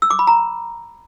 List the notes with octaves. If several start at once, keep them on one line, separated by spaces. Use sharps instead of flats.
E6
D6
B5
A#5